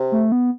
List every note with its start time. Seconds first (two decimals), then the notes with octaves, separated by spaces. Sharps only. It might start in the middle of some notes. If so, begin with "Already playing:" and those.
Already playing: C3
0.12 A3
0.32 B3